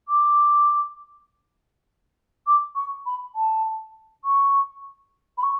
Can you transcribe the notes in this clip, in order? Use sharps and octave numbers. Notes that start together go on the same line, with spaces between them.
D6
D6
C#6
B5
A5
C#6
B5
C#6